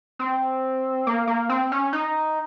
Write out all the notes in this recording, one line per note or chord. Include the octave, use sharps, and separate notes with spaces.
C4
A#3
A#3
C4
C#4
D#4